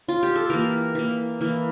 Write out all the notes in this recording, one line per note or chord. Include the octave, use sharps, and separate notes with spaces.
F4
G4
A4
E3 A#3 A#4
E3 A#3
E3 A#3